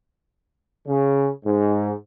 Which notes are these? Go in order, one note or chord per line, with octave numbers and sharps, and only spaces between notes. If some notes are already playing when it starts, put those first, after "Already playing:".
C#3
G#2